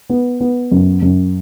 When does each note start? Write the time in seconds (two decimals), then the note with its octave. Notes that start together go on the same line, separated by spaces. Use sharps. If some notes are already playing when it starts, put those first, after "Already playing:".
0.10 B3
0.40 B3
0.71 F#2
1.02 F#2